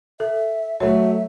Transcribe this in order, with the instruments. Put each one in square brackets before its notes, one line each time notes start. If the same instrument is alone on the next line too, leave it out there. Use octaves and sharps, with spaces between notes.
[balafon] A4 [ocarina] E5
[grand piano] F#3 A3 [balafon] C#5 [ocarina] E5